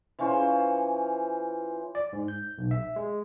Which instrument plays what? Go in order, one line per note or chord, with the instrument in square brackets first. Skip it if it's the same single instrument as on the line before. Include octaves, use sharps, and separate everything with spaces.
[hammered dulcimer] E3 F3 C#4 C5
[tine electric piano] D5
G#2
G6
B1
E5
G#3